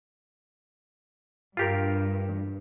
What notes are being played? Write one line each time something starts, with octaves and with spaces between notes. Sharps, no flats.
G2 F4 G4 A#4